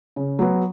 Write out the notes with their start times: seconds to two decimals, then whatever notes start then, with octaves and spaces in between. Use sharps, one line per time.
0.16 C#3
0.39 F#3 B3